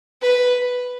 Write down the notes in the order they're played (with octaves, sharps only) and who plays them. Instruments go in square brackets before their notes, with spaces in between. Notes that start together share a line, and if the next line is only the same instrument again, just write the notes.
[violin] B4